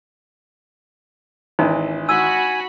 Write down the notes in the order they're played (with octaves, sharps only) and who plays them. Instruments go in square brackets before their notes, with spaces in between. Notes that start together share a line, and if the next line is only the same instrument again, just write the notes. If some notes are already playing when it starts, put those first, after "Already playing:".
[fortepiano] G#1 E3 [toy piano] D4 D#4
[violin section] F#4 B5 [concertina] G#5 [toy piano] E6